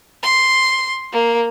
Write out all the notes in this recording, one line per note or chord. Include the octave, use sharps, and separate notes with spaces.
C6
A#3